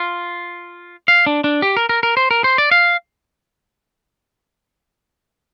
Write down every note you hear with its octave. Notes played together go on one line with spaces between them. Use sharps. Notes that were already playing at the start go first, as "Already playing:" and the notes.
Already playing: F4
F5
D4
D4
G4
A#4
A#4
A#4
C5
A#4
C5
D5
F5